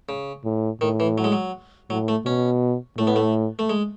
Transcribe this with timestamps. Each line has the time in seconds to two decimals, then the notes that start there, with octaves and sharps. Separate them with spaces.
0.09 C#3
0.45 A2
0.81 A2 D#3
1.00 E3
1.18 F#3
1.24 G#3
1.32 F#3
1.90 A2 F#3
2.08 A3
2.26 B2 C#4
2.98 A2 A3
3.07 B3
3.16 A3
3.59 A3
3.70 G#3